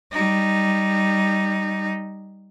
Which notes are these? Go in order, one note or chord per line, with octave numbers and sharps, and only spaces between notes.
G3 D#4